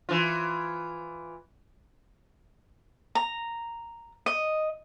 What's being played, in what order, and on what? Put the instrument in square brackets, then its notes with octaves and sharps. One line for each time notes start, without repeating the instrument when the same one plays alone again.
[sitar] E3 F4
[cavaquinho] A#5
D#5